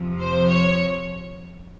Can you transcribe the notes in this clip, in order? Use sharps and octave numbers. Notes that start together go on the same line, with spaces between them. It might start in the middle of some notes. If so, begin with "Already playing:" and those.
Already playing: F2 C3 F3
C5
C#5